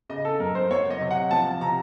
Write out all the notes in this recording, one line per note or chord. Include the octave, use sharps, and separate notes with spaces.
C#3 D#5
A4
F#2 A#4
C5
F#3 C#5
D#5
C3
F#5
F3 A5
C3 A#5